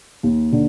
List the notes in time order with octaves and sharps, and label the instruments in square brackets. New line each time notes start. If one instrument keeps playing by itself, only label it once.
[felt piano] D#2
D3